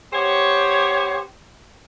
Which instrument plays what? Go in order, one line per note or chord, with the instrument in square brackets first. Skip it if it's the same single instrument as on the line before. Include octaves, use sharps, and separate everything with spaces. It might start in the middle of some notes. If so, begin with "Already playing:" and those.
[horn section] B3 G4 C5 C#5